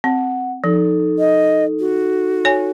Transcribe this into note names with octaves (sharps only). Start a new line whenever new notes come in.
C4 F#5
F3 D#4 A4
D#5
F#4
C#5 G#5